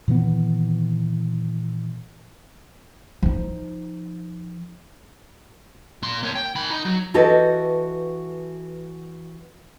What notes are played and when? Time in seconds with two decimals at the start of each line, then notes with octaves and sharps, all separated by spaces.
0.08 A#2 D#3 E3 B3
3.23 F3 D#4
6.03 A#2 C6
6.23 A#3 C#5
6.35 G5
6.55 D#3 B5
6.70 D#4
6.85 F#3
7.14 E3 F#4 G4 A4 B4 D#5